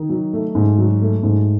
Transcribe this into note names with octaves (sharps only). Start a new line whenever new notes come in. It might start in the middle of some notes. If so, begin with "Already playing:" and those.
Already playing: D#3 D#4
F#3
A3
G#2
F#3
A3
G#2